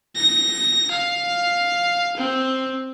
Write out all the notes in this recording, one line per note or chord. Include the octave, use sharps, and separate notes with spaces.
A#6
F5
C4